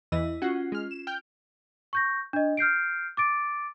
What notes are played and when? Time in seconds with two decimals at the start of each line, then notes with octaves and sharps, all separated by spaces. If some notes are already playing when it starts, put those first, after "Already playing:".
0.12 E2 E3 E4 D#5 E6
0.42 C#4 F4 F#4 F#5
0.72 G#3 F6
0.91 E7
1.07 G5 F6 G6
1.93 C#6 G6 A#6
2.33 D4 D#5
2.57 F6 G6 C7 D7
3.17 D6 A6 D7